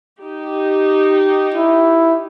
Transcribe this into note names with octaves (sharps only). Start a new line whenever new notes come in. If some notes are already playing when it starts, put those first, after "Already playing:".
D#4 G4
E4